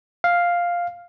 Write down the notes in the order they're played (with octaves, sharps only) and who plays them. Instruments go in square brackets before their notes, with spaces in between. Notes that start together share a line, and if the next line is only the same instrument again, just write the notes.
[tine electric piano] F5